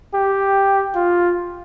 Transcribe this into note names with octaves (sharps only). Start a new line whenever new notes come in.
G4
F4